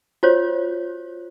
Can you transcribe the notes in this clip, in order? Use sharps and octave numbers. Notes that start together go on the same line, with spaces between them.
F4 F#4 C5 C#5